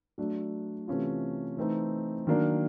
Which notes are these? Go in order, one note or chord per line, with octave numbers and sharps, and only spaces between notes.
F#3 A3 D4
C3 E3 A3 C#4 F4
E3 A3 C4 D#4
D#3 F#3 A#3 D4